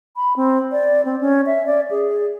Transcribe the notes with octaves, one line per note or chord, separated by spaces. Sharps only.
B5
C4
D5
C4
C#4
E5
D5
G#4